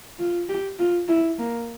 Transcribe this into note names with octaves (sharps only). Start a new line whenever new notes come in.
F4
G4
F4
E4
A#3